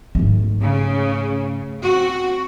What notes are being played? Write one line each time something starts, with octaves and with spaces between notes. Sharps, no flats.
G#2 A3
C#3
C4 F#4